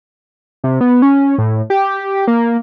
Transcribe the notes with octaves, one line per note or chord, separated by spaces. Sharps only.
C3
B3
C#4
A2
G4
A#3